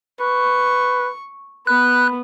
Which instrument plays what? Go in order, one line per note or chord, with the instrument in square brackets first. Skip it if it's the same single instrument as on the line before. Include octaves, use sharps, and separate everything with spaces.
[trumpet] B4 [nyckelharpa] C#6
[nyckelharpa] B3 [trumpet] B5 [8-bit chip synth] F#6